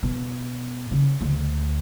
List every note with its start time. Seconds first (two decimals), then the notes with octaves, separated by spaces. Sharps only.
0.03 B2
0.91 C#3
1.21 D2